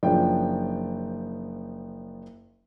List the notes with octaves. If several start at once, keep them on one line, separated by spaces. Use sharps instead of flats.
F#1 F3 C#4 D4 G5